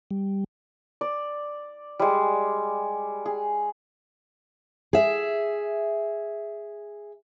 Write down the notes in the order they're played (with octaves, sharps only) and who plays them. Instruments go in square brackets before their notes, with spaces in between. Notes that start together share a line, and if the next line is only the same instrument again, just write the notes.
[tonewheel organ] G3
[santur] D5
G3 G#3
G#4
[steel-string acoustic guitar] G#4 E5